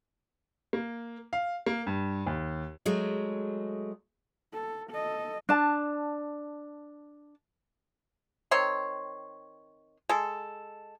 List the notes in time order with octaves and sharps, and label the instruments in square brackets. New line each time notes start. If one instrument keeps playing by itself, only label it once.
[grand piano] A#3
F5
A#3
G2
D#2
[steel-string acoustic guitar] F#3 G#3 A3
[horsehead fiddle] A4
A4 D#5
[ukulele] D4 A5
[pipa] D#3 C4 C#5 C6
G#3 A4